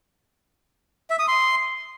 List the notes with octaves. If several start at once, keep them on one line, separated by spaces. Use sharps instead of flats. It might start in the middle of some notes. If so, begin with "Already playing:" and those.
E5
D#6
C6